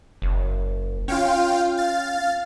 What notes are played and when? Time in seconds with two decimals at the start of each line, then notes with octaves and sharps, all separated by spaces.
0.22 F#1
1.08 C#4 F4 F5 G5
1.77 F5 A6